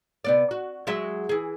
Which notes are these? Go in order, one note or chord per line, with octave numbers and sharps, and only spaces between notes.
C3 B3 D5
F#4
F#3 G#3 E5
E3 G#4